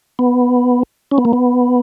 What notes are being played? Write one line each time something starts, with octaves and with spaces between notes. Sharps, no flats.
B3
C#4
B3
A#3
B3